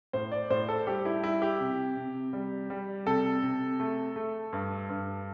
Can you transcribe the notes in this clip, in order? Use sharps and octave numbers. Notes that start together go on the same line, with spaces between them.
A2 C5
D5
A2 C5
A4
G3 G4
E4
G3 E4
G4
C3
C3
G3
G3
C3 A4
C3
A3
A3
G2
G2